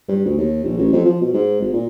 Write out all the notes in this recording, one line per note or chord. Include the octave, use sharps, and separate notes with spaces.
G2
D2
D#2
A#1
A1
F2
F3
B2
G#2
G#1
A#2